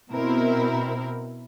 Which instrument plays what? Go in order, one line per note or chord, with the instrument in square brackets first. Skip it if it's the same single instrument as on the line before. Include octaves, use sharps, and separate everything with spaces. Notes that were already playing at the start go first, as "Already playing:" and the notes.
[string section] B2 C4 E4 A#4